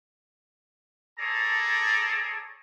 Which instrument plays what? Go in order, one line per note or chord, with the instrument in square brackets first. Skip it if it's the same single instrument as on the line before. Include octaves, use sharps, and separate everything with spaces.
[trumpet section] G#4 A4 C#5 D5 A5 A#5